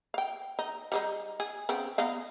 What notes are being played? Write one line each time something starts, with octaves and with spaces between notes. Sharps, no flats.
F5 G5
D#4
G3 G#3 D#4
G#4
C#3 B3 C4
B3 D#4 F5